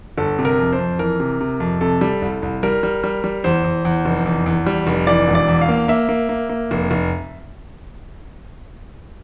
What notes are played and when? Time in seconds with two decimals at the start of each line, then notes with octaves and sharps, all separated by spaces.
0.18 G1 A4
0.39 C3
0.45 A#4
0.59 F2
0.73 C5
0.79 F2
0.99 E3 A#4
1.20 C3
1.41 C3
1.60 F2
1.81 C3 A4
2.01 G3
2.22 C2
2.42 C2
2.63 G3 A#4
2.83 G3
3.04 G3
3.24 G3
3.44 E2 C5
3.64 E2
3.85 E2
4.05 F1
4.26 E2
4.46 E2
4.66 G3
4.87 F1
5.07 E3 D5
5.28 E1
5.35 D5
5.48 E2
5.61 F5
5.68 A#3
5.88 A#3 E5
6.09 A#3
6.29 A#3
6.49 A#3
6.71 F1
6.91 F1